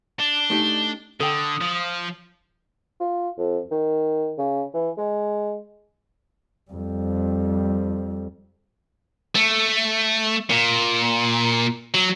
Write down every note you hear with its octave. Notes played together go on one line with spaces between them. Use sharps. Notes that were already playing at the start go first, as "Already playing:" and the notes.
D4 G7
A3 D#4 G4
D3 A4 G5 D#6
F3
F4
F2
D#3
C#3
E3
G#3
F2 G3
A3
A#2
F#3